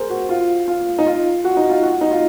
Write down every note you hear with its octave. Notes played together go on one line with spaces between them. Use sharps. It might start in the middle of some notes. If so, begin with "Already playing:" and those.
Already playing: G#4 A#4 C5
F#4
F4
F4
D#4
F4
F#4
D#4
F4
F#4
D#4
F4